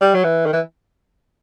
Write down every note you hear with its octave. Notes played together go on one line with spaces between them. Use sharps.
G3
F#3
E3
D#3
E3